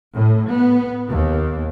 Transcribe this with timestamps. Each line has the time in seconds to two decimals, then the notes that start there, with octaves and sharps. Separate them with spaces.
0.14 A2
0.52 B3
1.10 D#2